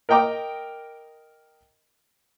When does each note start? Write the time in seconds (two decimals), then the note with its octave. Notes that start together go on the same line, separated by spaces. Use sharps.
0.09 A#4 D#5 G5 A#5 D6